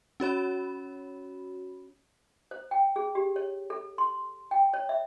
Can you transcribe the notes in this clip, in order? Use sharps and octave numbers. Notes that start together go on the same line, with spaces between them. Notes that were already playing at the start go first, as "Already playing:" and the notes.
C#4 F#4 C#5 B5
C5
G5
G#4
G4
C#5
A4
C6
G5
C#5
E5